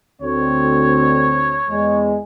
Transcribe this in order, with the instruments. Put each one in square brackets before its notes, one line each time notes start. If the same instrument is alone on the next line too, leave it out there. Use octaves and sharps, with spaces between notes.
[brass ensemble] D2 C4 [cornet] C#5
[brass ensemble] E2 G#3